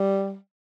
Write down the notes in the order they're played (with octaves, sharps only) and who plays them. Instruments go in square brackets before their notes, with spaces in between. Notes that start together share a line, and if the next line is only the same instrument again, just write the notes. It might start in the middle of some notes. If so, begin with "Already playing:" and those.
Already playing: [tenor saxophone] G3